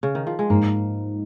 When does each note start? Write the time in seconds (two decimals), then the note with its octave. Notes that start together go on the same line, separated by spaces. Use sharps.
0.03 C#3
0.15 D#3
0.27 F3
0.39 G#3
0.50 G#2 A#3